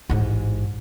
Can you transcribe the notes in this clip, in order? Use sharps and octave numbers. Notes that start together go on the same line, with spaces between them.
A1 G#2